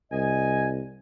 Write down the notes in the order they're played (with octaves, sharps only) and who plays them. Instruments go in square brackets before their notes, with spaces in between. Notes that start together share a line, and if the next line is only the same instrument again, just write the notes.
[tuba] C2 [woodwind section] D#5 G#5